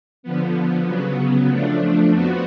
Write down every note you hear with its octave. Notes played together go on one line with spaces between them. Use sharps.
D3 F3 B3
C#3 F#3 B3
F3 A3 D4
F2 F3 B3 F#4